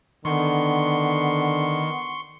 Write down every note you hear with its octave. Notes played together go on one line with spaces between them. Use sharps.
D3 D#3 B3 C6 C#6